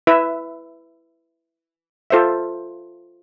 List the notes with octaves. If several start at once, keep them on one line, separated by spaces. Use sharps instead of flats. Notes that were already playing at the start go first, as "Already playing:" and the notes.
E4 B4 E5
F4 A4 C5 E5